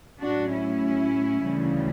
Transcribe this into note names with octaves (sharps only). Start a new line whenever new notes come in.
A2 F#3 D4 F#4
C#4 E4
D2 C#3 E3 G3